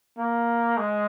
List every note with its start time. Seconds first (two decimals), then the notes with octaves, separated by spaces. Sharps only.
0.18 A#3
0.77 G#3